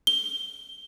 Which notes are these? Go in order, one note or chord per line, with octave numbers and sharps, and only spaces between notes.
G7